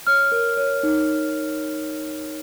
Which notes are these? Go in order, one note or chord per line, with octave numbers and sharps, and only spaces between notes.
C#5 F6
A#4
C#5
D#4